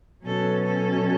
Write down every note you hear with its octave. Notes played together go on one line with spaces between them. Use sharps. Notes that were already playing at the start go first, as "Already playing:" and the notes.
B2 F#3 C#4 A4
A4